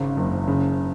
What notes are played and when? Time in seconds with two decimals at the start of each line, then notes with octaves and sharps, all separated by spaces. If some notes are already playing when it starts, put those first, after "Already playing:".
Already playing: G#1 C#3
0.17 F#1
0.48 C#3